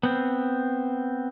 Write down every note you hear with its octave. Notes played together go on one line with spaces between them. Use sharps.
B3 C4